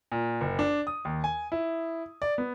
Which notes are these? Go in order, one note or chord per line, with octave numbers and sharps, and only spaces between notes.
A#2
F#1
D4
D#6
D#2
G#5
E4
D5
B3